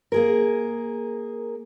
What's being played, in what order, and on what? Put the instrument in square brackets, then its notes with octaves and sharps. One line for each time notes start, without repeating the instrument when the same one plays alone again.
[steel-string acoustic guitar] A#3 G#4 A#4